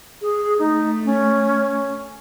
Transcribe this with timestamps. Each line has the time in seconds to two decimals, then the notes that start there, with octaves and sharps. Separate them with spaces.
0.22 G#4
0.59 A3 D#4
1.05 C#4